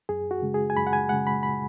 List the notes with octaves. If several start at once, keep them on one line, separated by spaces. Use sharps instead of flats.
F#2 G#4
F#4
C#3 G#3
G#4
G#5
F#2 B5
F#5
G#5
C#3 G#3 F#5
B5
B5